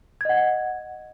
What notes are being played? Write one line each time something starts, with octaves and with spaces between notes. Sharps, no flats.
D#5 F#5 G#6